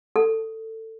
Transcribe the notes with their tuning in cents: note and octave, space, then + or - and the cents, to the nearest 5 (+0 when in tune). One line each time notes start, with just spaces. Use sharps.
A4 +20